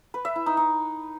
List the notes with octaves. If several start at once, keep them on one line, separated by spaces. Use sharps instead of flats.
B4
E5
E4
D#4
D#4